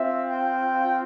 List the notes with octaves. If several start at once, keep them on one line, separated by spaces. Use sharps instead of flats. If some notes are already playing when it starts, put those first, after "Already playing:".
Already playing: C4 F4 E5
G5